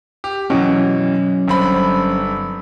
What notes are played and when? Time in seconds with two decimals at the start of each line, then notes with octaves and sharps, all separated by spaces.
0.24 G4
0.50 B2 E3 F#3 C#4
1.48 G1 C4 B5